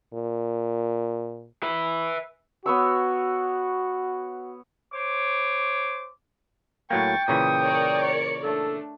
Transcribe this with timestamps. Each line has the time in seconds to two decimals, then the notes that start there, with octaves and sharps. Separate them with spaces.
0.14 A#2
1.63 B4 E5
2.66 B3 F#4 C#5 E6
4.93 C5 C#5 D6
6.91 A2 F#3 A#3 G5 C#6 A6
7.28 A#2 C#3 E3 C#6 D#6
7.61 A#4 C#5 D5
8.03 C#7
8.43 A3 D4 A4